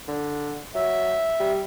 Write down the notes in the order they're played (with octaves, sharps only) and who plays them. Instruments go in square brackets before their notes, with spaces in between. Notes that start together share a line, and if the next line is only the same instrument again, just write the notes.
[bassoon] D3
[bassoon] F#3 [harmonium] E5
[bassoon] G3